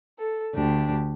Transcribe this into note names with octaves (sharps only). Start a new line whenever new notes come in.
A4
D2 D4 G4